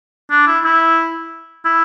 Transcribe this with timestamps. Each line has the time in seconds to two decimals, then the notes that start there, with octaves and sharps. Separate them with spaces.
0.31 D4
0.47 E4
0.64 E4
1.65 E4